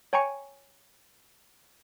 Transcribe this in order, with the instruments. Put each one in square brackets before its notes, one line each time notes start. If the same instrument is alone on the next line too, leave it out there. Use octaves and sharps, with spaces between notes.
[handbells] C#5 G5 G#5 A#5 C#6 C#7